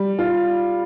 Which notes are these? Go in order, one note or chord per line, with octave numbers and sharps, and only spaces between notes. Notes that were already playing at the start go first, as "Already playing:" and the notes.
Already playing: G3
F4